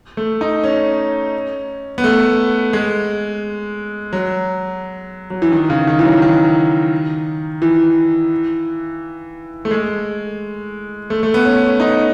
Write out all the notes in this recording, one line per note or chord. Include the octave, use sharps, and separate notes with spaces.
A3
D#4
C#4
B3
A3
G#3
F#3
F#3
E3
D#3
C#3
D#3
E3
F#3
D#3
E3
A3
G#3
A3
A3
B3
C#4
D#4